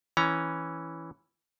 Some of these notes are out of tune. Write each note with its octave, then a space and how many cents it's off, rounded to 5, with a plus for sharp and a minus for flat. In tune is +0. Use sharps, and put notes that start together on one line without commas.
E3 +0 C#4 +0 A#5 +0